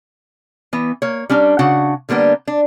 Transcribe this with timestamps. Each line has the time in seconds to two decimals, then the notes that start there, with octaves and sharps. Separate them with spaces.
0.73 E3 B3
1.02 A#3 C#5
1.30 G3 C#4 D4 A#5
1.59 C#3 D4 F#4 F#5
2.09 D3 G3 A#3 B3 D4
2.47 D4